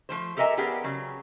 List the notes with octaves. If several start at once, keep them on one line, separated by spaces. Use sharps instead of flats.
F3 A3 C5
G4 A4 A#4 D#5 E5 G#5
B3 D4 G4 G#4 A#4
C#3 F#3